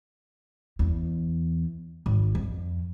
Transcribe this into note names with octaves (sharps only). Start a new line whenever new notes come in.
E2
G#1
F2